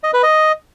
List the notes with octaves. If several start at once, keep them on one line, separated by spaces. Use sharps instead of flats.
D#5
B4
D#5